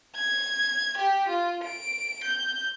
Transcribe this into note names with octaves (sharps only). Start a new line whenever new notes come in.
G#6
G4
F4
D7
G6